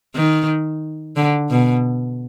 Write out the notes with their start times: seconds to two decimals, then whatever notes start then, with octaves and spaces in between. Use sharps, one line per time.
0.16 D#3
1.16 D3
1.50 B2